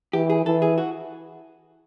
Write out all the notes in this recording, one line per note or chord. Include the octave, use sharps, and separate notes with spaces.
E3 G4
G#4
E3 A4
G#4
F#4